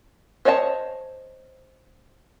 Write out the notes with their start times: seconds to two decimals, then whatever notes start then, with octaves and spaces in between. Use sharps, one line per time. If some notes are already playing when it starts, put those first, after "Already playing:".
0.45 C5 C#5 D#5 G#5 A5